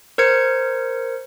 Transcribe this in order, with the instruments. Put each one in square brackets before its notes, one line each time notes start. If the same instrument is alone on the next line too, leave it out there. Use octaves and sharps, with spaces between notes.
[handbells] A#4 C5 G#6 C#7